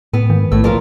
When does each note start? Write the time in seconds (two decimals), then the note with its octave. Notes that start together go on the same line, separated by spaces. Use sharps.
0.14 A2 B3
0.30 G#2 D#3
0.52 A#1 A2 E6
0.64 A#2 F3 A#4 F5